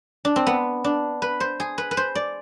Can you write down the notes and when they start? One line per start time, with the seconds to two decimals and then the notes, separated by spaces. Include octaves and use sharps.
0.25 D4
0.36 C4
0.47 B3
0.84 D4
1.22 B4
1.40 C5
1.60 G#4
1.78 B4
1.91 B4
1.97 C5
2.15 D5